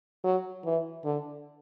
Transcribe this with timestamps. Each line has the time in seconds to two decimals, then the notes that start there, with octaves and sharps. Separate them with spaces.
0.24 F#3
0.65 E3
1.04 D3